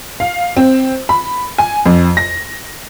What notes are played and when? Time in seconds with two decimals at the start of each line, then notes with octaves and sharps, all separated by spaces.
0.20 F5
0.57 C4
1.09 B5
1.58 G#5
1.86 F2
2.17 A#6